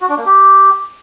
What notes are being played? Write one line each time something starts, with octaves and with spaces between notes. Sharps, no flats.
F#4
D4
A#3
G4